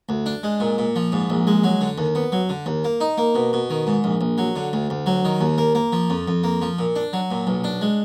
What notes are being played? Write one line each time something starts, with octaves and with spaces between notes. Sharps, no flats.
D2
D4
G#3
A#2
A#2
F3
G#2
A#1
G#3
F#3
D3
D#2
B3
F#3
D3
D#2
A#3
D#4
A#3
B2
B2
D#3
G#2
A#1
A#1
F#3
D3
D2
D2
F#3
D#3
D#2
A#3
A#3
F3
F2
F2
A#3
F3
A#2
D4
F#3
A#2
B1
D4
G#3